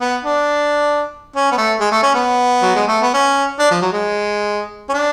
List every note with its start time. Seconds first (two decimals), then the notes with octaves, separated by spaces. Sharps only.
0.01 B3
0.23 D4
1.36 C#4
1.52 B3
1.58 A3
1.80 G#3
1.92 A3
2.03 C#4
2.14 B3
2.62 F#3
2.75 G#3
2.88 A3
3.02 B3
3.14 C#4
3.59 D4
3.70 F3
3.82 F#3
3.93 G#3
4.89 C#4
4.94 D4